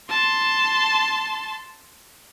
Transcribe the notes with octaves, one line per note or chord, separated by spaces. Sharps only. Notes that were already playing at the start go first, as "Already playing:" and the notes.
A5 C6